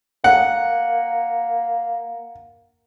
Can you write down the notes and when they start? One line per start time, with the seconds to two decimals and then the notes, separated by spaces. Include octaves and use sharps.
0.24 A#3 F#5